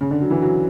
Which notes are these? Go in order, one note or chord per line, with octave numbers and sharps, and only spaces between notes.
C#3
D3
F#3
E3
F#3